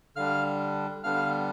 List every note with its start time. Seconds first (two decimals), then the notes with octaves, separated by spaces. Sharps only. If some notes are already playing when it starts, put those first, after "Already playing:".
0.16 D3 G3 D4 F5 F6
1.04 D3 G3 B3 D4 F5 F6